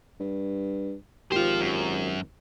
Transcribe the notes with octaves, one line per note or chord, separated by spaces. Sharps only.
G2
G#1 F4 G4 C5 F5
F#2